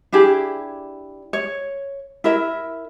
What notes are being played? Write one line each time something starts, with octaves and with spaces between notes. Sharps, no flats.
D4 E4 G4 G#4
C#5
E4 A#4 E5